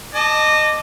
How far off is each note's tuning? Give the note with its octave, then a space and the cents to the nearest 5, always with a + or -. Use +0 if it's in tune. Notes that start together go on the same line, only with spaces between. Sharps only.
D#5 -20 A5 +0 D6 +0